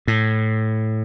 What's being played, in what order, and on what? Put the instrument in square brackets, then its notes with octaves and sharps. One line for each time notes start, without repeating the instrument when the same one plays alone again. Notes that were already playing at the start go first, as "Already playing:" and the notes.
[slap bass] A2